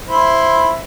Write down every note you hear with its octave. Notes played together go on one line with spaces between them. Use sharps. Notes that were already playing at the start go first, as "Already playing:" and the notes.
E4 C5 B5